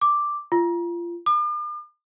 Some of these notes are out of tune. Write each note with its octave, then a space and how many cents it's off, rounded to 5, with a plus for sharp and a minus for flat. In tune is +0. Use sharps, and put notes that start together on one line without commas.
D6 +0
F4 -25
D6 +45